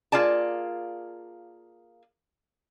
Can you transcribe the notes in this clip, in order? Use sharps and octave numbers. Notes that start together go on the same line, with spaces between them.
A#3 F4 G#4 D5 A5